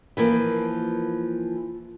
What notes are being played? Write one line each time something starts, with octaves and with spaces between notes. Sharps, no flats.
E3 F3 A#3